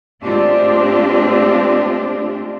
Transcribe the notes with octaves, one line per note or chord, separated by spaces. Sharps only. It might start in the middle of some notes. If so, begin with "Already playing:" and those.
G#3 A3 C4 D4 F4 G4